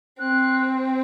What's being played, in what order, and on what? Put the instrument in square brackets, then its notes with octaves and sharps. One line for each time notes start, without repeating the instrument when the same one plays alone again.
[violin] C4 [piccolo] F#6